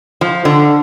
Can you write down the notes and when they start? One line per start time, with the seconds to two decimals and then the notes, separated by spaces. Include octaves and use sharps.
0.21 F3
0.45 D3